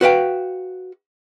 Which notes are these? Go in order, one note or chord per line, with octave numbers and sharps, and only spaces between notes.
F#4 B4 F5 G5